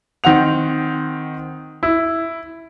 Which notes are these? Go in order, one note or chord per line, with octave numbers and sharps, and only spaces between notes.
D#3 C4 F#5 F7
E4